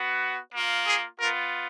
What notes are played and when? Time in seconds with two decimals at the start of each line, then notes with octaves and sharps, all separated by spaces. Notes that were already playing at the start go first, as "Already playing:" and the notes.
Already playing: B3 F#4
0.52 A#3 F4
0.86 G#4
1.20 B3 F4 A#4